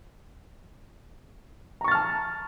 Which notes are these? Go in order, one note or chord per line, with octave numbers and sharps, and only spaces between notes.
A5 A#5 C#6 F6 A6